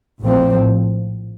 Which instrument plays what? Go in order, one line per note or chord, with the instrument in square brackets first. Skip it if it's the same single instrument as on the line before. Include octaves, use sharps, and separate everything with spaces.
[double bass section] A#1 A2 F3 C4